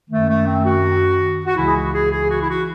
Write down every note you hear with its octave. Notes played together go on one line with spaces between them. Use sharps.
F#2 D#3 A3
A3
C4
F#4
F#4
C#2 C#3 E3 E4
G#4
F#4
G#4
G#4
F#4
E4
F#4